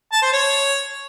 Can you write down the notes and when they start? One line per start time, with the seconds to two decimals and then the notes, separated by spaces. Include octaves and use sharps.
0.13 A5
0.23 C5
0.33 C#5